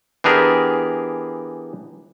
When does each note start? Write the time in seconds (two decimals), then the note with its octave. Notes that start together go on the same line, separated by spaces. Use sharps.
0.24 E3 B3 D4 G4 G#4 A#4